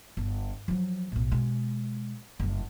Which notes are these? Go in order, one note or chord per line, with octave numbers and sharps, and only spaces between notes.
G1
F3 F#3
B1 A2
B2 G#3
F#1 G2